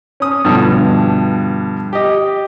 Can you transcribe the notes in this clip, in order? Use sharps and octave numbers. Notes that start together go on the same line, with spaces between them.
C#4 D#6
G2 B2 D3 F3
G4 D#5